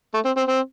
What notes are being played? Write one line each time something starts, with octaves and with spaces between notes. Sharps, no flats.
A3
C4
C4
C4